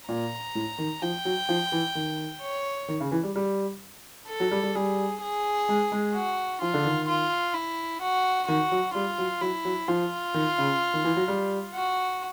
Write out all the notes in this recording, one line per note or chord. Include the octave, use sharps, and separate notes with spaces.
A#2 A#5
A2
D#3
F3 G5
F#3
F3
E3
D#3
C#5
D#3
C#3
E3
G3
G3
A4
F#3
G3
G3
G3 G#4
G#4
G#3
G#3
F#4
F3 F4
D3
D#3
F4
E4
F#4
D#3 F#4
F#3
G3 F4
F#3
F#3 E4
F#3
F3 F4
D#3
C#3
D#3
E3
F#3
G3
F#4